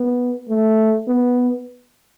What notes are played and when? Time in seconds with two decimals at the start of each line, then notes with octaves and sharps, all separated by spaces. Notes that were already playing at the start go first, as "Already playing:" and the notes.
Already playing: B3
0.49 A3
1.08 B3